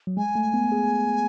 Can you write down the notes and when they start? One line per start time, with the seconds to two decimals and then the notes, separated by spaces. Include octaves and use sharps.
0.07 F#3
0.17 G#3 G#5
0.35 A3
0.54 B3
0.72 G#4